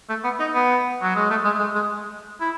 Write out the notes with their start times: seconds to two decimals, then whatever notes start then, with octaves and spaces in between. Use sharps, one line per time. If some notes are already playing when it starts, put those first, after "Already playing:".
0.09 A3
0.24 B3
0.40 D#4
0.54 B3
1.02 F#3
1.16 G#3
1.30 A3
1.45 G#3
1.59 G#3
1.75 G#3
2.41 E4